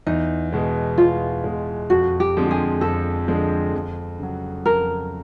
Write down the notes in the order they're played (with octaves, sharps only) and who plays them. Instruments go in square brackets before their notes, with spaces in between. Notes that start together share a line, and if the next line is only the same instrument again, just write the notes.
[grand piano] E2 [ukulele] D#4
[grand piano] B2 G#3
[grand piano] E2 [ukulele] F4
[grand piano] B2 G#3
[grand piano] F2 [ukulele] F#4
[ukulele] G4
[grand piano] D3 F3 G#3 C4
[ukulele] G#4
[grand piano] F2 [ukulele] A4
[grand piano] D3 F3 G#3 C4
F2
C#3 F#3
[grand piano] F2 [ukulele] A#4